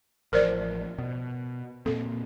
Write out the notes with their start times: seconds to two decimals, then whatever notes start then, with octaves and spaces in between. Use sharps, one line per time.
0.33 A1 F3 A#4 C5 D5
0.98 B2
1.86 A#2 A#3 C4 A4